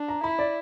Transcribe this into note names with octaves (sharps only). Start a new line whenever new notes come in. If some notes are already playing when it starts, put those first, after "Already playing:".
Already playing: D4
A#5
E4 B5
D5